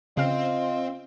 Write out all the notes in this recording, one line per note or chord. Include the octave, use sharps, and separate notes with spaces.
C#3 C4 F4 D#5 F5